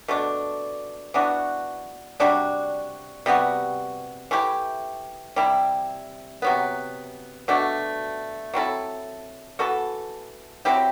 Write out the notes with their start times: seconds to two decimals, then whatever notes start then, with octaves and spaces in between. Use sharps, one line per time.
0.08 B2 A3 D4
1.14 E3 B3 D4 F#4
2.20 C3 G3 D4 F#4
3.26 C3 G3 B3 F#4
4.31 E3 A3 E4 G4
5.36 C3 G3 C4 E4
6.42 C3 F#3 B3
7.48 B2 A3 D4 F#4
8.54 F#3 C4 E4 A4
9.59 E3 B3 F#4 A4
10.65 F#3 C4 E4 G4